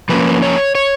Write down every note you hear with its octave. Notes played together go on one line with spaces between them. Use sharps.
F3 A#3 C#4 B4
C#5
C#5